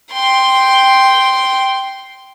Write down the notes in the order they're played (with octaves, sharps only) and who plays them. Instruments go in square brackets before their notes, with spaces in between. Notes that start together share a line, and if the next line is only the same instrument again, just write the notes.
[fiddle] G5 C6